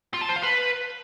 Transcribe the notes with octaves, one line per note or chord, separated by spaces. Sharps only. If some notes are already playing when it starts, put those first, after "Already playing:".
F4
A5
C5
F5
B4